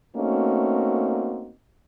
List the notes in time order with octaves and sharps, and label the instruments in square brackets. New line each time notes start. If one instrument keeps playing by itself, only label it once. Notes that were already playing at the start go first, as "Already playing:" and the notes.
[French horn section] A3 A#3 C4 C#4 D#4 F#4